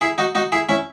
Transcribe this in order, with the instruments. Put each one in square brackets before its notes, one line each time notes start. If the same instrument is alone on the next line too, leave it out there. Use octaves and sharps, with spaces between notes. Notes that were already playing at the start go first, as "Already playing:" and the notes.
[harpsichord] E4 G#4
D#4 F#4
D#4 F#4
E4 G#4
C#4 E4